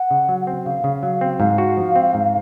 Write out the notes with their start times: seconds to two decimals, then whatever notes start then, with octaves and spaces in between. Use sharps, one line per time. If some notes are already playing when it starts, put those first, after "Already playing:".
Already playing: F#5
0.11 C#3
0.29 F#3
0.47 C4
0.66 C#3 F5
0.84 C#3
1.03 F#3 F5
1.21 C4
1.40 G#2 F5
1.58 F#4
1.77 F3
1.96 C4
2.14 G#2